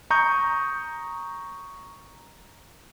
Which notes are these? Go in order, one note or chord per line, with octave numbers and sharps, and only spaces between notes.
A#5 C#6 D#6 G6